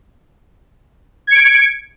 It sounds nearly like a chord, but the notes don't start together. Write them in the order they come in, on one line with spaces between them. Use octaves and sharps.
G#6 C#7 D7